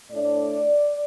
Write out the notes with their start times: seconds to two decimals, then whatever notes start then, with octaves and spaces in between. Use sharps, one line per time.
0.11 A2 A3 D4 D5